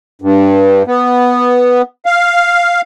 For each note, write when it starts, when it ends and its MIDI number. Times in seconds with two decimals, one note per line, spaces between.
0.22 0.83 43
0.87 1.82 59
2.06 2.81 77